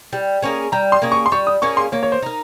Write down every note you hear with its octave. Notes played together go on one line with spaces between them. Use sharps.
G3
A#3 C#4 G#4
G3 A#5
C6
A#3 C#4 G#4
C#6
C6
G3 C#6
D#6
A#3 C#4 G#4 C#6
C6
A#3 C#5
C#5
C5
D#4 A#4